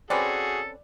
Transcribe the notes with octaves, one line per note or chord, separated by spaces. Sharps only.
C4 C#4 F#4 G#4 A4 B4 D5